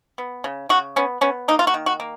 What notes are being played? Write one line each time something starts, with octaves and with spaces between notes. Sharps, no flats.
B3
C#3
C#3 F#4
B3 C#4
B3 C#4
A#3 D#4
F4
F#4
D#3
F#4
A#3